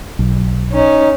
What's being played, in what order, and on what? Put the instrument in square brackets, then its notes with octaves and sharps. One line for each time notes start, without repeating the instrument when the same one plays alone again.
[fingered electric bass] B1
[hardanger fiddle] C#4 [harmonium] D#4